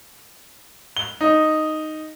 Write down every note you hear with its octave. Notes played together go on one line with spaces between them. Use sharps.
G7
D#4